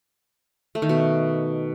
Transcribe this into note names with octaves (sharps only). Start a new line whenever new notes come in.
A3
D#3
B2